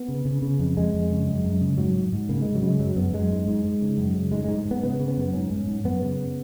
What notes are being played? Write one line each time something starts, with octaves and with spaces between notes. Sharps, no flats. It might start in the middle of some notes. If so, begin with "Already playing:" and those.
Already playing: B3
C#3
C#3
C#3
F2
F2 G#3
F2
C#3
F#2
F#2
C#3
G#2 F#3
G#2
G#2
C#3 A#3
C#3 G#3
F#3
C#3 G#3
F#2 F#3
F#2 B3
F#2 G#3
G#2
G#2
G#2
C#3
F#2
C#3
G#2 G#3
G#2 G#3
G#2
B3
C#3 B3
C#3
B3
F#2
G#2 C#4
G#2
G#2
F#2 B3
C#3